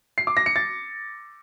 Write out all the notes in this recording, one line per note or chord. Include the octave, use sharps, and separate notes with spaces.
C7
D6
A#6
C#7
A6